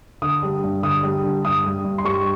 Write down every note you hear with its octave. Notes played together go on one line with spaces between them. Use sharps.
D3 D#6
G3
G2
D3 D#6
G3
D3
G2 D#6
G3
G2
C6
G3 C#6